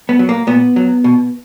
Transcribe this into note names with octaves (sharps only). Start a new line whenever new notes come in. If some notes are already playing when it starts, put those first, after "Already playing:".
B3
F#3
A#3
A#2 B3
F#3
B2